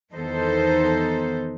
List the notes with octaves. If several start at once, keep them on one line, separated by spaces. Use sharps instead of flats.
E2 D#3 B3 D#4 A4 C5